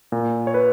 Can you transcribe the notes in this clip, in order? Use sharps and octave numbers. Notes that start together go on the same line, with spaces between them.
A#2
C#5
B4